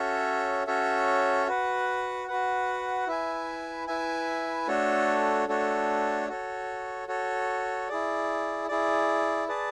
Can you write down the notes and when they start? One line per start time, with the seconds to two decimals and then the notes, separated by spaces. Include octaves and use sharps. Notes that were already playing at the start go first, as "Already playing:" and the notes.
Already playing: C#4 F#4 A4 C#5 E5
0.67 C#4 F#4 A4 C#5 E5
1.47 F#4 B4 F#5
2.28 F#4 B4 F#5
3.07 E4 B4 E5 G#5
3.87 E4 B4 E5 G#5
4.67 A3 D4 F#4 A4 C#5
5.48 A3 D4 F#4 A4 C#5
6.28 F#4 A4 C#5
7.08 F#4 A4 C#5
7.88 E4 G#4 D5
8.68 E4 G#4 D5
9.48 G#4 B4 D5 A5